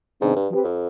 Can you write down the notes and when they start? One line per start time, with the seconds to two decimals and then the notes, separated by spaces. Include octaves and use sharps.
0.21 G#2 C3 D#3 B3 D4
0.36 G2
0.49 F3 C4 G4 B4
0.64 F2